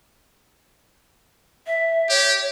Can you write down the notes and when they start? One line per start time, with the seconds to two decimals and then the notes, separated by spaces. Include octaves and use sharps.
1.67 E5
2.09 G4 C#5